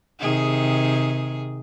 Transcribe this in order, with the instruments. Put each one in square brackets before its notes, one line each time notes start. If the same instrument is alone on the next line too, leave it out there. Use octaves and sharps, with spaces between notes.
[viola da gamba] C3 D#3 G#4